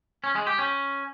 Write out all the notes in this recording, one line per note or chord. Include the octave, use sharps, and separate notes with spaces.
C#4
G#3
G4
C#4